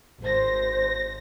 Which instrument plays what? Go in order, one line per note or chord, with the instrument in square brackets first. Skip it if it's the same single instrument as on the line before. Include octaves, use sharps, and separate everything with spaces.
[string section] G#1 A#6 [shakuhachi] C5